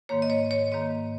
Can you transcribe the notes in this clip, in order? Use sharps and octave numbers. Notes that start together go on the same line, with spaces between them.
G#2 D#3 A#3 C#5
D#5
C#5
C#5
G#2 D#3 A#3 D#5